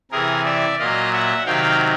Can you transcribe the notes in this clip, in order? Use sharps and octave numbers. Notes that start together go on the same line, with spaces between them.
C3 E3 G#4 A#4
D5 E5
A#2 F#3 D#5 F5
E5 F#5
C3 D#3 F#3 F5 G5